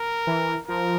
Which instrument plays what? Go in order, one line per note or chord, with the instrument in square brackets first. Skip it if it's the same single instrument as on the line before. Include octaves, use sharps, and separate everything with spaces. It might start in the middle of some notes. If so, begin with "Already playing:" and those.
Already playing: [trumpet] A#4
[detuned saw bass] E3
[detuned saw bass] F3 [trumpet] A#4